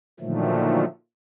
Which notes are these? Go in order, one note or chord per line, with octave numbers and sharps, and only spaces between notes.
A#2 D3 D#3 F3 F#3 A3